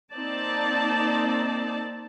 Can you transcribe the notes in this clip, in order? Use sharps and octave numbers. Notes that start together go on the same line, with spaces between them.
A#3 C4 D#4 D5 A5